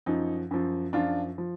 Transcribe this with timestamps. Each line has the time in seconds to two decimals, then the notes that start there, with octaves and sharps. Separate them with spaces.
0.06 F#2 F3 D#4
0.51 F#2 F3
0.93 F#2 F3 D4 F4
1.38 F3